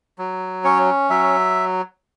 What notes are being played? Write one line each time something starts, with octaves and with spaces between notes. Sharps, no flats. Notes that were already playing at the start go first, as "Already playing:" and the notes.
F#3
C#4 C#5
F#3 E5